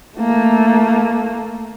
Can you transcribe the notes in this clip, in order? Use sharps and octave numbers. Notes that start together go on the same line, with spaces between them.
A3 A#3